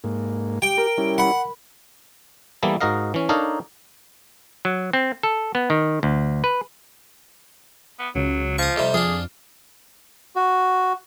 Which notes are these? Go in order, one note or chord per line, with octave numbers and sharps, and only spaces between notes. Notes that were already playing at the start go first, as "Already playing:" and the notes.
G#2 A#3
G4 G5
A#4
G3 C#4 E4
F#5 B5
E3 G3 A#3 B3 E4 A4
G#2 F#4 A#4 D#5 F5
E3 C#4
D4 D#4 A4 A#4 C#5 F5
F#3
C4
A4
B3
D#3
D2
B4
B3
C#2 C#3 F#3
F3 C#6 D#6
F2 C3 G3
F2 D4 F4 G#4
F#4